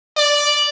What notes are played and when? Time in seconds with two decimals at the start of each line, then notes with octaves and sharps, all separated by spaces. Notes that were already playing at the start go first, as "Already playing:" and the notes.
0.17 D5